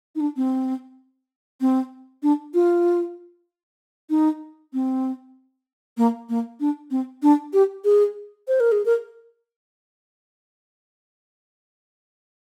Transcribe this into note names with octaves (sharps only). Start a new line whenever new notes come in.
D#4
D4
C4
C4
D4
F4
D#4
C4
A#3
A#3
D4
C4
D4
G4
G#4
C5
A#4
G#4
A#4